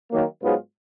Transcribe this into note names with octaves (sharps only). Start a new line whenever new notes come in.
D#3 F#3 A#3
G#2 F#3 B3 F4 G#4